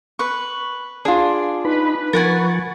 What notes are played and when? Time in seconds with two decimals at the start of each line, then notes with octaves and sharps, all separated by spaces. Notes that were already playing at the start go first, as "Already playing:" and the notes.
0.19 B4 C#6
1.05 D4 F4 G#4
1.65 D#4 B4 B5
2.13 F3 A#4 F#5 G#5 C#6 A6